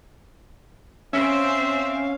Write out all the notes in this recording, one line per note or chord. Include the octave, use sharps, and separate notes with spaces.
C4 C#4 C5 E5 F5